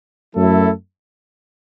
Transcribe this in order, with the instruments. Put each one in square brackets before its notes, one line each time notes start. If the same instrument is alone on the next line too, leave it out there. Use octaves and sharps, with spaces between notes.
[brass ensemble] F#2 F#3 A3 E4 A4